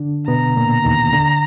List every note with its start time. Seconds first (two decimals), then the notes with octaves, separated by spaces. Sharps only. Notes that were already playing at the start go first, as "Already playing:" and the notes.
Already playing: D3 D4
0.28 B2 B3 A#5
0.57 A#2 A#3
0.84 D#2 D#3
1.13 D3